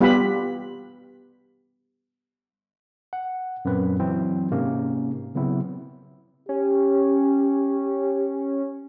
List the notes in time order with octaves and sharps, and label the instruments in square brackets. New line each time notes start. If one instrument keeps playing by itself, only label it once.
[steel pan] G3 B3 F4 G4 F#5 B5
[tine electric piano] F#5
F#2 A#2 C4 B4
E3 F#3 C4 E4
G#2 C3 A#3 C#4
C#3 F#3 B3 C4 E4
[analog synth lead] C#4 [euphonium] G4